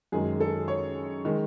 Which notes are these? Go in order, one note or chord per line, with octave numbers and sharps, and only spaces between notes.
F#2 D#3 G#3 G#4
A4
C#5
D#3 G#3